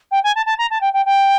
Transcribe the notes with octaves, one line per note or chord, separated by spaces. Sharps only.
G5
G#5
A5
A5
A#5
A5
G5
G5
G5